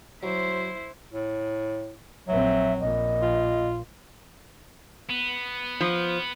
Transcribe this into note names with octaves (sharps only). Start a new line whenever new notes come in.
F#3 E4 C5
A2
A#1 F#3 C4 E5
A#1 A#2 D#5
F4
B3
F3